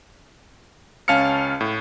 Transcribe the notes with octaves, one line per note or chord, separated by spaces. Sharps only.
C#2 C#4 F5 A5 F6 C#7
A2